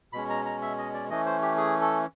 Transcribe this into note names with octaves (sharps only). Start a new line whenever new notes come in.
B2 G#3 C#4 B5
A#5
A#5
E5
D#5
D5
E3 A3 C#4 D#5
C5
G4
G#4
A4